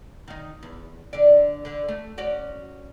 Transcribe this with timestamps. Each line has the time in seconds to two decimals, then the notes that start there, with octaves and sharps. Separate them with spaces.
0.28 D#3 D#4
0.63 E2
1.13 D3 D5
1.65 D3
1.88 A3
2.18 C#4 F#4 D5